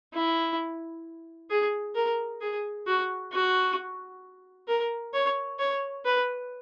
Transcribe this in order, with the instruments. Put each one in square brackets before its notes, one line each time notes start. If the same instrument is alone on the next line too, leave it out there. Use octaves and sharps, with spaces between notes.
[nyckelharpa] E4
G#4
A#4
G#4
F#4
F#4
A#4
C#5
C#5
B4